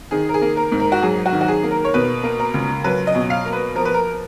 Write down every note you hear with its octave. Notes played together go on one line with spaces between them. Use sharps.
D#3 G#4
A#4
G#4
A#3
A#4
G#2
A#4
F#4
F#3 G#4
F#4
D#3
F#4
G#4
A#3
A#4
C#5
B2 B4
A#3
A#4
C#2
F#3 B4
D#5
B2
F5
A#3
B4
F3 A#4
B4
A#4